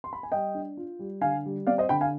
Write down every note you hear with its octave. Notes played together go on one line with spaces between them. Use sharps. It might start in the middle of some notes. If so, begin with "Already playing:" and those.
C6
B5
G#5
G3 D#5 G5
D4
F4
G3
D3 F5 G#5
G3
C4 D5 F5
C5 D#5
D3 G5 B5
F5 G#5